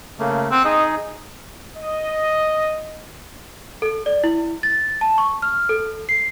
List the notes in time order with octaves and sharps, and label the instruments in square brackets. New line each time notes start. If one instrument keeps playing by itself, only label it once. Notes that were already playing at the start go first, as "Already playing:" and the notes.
[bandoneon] C#3 A3 A#3
[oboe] C4 [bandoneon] F#5 F#6
[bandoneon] D#4 G#4 [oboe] D#5
[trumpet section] D#5
[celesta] A4
D5
E4
A6
A5
C#6
F6
A4
C7